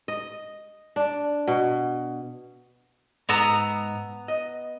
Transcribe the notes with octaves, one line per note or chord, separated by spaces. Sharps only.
D#5
D4
B2
G#2 B3 A#5 E6
D#5